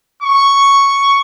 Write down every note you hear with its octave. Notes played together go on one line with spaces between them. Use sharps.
C#6